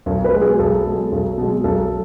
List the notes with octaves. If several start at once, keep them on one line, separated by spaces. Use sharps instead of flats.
B1
B4
B2 G#3
G#4
B1 A4
B2 G#3
B1
B2 G#3
B1 A4